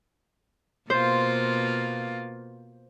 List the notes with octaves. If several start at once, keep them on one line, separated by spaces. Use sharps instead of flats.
B2 A#3 F4 C5